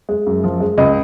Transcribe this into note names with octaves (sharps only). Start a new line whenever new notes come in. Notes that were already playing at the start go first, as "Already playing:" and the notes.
G#3
F#2
F3
G#3
C#2 D#5